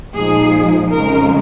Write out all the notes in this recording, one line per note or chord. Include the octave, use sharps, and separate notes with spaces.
A#2 F3 G#3 D#4 G#4
F2 C#3 G#3 A#4